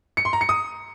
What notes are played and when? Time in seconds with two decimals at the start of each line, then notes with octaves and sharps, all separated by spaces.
0.17 C#7
0.25 C6
0.33 A#5
0.41 C#7
0.49 D#6